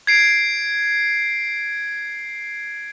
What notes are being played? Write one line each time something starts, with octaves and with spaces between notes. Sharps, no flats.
G#6 C7 D7